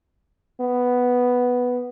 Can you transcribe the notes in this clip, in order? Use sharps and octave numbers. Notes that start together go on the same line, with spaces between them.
B3